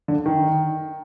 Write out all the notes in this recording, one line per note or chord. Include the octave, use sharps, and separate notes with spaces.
D3
D#3